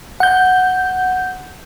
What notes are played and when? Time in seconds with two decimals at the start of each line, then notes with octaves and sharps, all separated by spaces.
0.20 F#5 G6